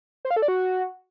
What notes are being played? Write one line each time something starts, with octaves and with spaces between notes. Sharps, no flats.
C5
F5
A4
D5
F#4